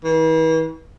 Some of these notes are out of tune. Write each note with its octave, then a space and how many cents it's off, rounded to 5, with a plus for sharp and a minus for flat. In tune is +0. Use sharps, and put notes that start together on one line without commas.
E3 -40